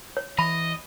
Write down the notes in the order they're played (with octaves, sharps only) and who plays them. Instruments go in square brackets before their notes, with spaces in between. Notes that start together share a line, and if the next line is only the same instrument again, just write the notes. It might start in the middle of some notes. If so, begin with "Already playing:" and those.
[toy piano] C#5
[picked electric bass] E3 [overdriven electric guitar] D#5 [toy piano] B5